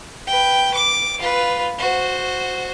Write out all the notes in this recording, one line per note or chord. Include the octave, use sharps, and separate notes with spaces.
B4 G5
D6
F4 B4
F#4 C5